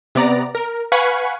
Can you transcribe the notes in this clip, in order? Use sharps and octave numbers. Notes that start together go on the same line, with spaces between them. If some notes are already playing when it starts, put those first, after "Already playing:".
C3 B3 D5 A#5
A#4
B4 F5 F#5 G#5 B5 C#6